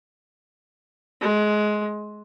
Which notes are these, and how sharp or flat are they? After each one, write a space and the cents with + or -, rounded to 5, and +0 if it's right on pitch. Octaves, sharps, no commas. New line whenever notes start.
G#3 +20